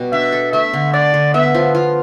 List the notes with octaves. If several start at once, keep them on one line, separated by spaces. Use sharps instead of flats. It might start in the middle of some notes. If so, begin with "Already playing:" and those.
Already playing: B2 G3
D4 E5
A4
A3 E5
D3
D4 D5
D3
B3 E5
F3
F4